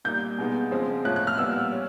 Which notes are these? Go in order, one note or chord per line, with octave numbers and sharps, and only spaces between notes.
A#2 G3 A#3 D#4 G6
B2 G#3 B3 D#4
F2 C#3 F3 G#3 C4
A2 F3 A#3 C#4 F#6
F#6
F6
A#2 G3 B3 E6
C#4